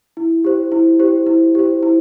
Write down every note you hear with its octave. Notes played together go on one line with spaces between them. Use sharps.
E4
G4 C5
E4
G4 C5
E4
G4 C5
E4